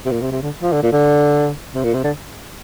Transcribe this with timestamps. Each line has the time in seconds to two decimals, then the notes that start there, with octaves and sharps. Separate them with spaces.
0.05 C3
0.11 A#2
0.21 C3
0.32 C3
0.42 D3
0.62 F3
0.72 D3
0.83 A#2
0.93 D3
1.74 C3
1.84 A#2
1.94 C3
2.04 D3